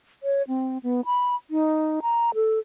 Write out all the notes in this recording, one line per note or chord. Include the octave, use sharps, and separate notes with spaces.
C#5
C4
B3
B5
D#4
A#5
A4